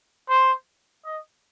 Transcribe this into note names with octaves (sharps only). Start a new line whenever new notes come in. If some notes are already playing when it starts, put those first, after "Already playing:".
C5
D#5